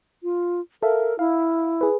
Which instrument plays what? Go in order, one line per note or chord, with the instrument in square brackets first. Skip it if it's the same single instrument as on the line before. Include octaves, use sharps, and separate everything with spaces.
[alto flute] F4
[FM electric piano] A4 E5 F5 [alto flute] A#4
[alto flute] E4 [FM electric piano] F5
[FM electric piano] G#4 B4